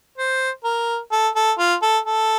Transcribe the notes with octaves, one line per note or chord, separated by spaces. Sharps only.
C5
A#4
A4
A4
F4
A4
A4